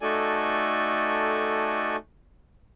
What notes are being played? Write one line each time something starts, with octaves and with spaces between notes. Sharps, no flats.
A3 D#4 F#4 A4 D5 G#5